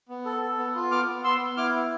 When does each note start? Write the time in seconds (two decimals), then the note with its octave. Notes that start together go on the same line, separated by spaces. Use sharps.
0.09 B3
0.26 A4
0.42 A4
0.58 B3
0.75 F4
0.91 B3 D6 F6
1.08 B3
1.24 B3 C6 E6
1.40 B3
1.57 E4 D6 F6
1.73 B3